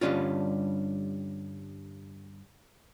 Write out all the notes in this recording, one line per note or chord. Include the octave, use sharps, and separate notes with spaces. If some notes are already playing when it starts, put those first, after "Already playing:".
G2 D3 G3 C#4 F4